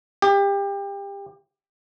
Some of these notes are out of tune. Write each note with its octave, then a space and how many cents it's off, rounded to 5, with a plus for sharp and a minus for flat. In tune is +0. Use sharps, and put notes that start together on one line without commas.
G4 +25